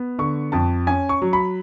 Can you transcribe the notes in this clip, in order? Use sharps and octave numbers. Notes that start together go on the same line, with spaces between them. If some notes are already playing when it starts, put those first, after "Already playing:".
Already playing: B3
D3 C#6
F2 A5
C#4 G#5
C#6
F#3
B5